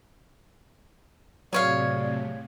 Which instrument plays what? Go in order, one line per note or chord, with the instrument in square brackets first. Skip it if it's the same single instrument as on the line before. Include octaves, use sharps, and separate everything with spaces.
[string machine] A2 C3 [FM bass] F#3 [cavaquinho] G#4 C#5 F5 [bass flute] D5